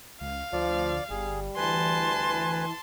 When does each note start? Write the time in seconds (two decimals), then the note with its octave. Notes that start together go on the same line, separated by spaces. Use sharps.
0.21 C#2 F5
0.53 D2 F3 D5
1.10 G1 G3 G#4
1.56 D2 E3 B4 G#5 A5 C6